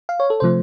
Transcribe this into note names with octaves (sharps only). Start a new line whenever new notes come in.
F5
C#5
A4
C3 F3 A3 C5